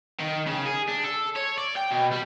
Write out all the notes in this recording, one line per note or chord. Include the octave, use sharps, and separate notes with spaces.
D#3
C#3
G#4
D4
A4
C#5
D5
G5
B2
G3